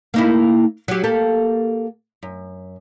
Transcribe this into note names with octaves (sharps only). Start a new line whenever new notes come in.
A#3 D#4 E4
F#3 G4
A#3 G4 A4
F#2